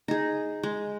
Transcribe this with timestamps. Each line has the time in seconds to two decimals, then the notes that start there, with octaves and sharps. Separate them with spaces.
0.08 D#4 G#4
0.63 G#3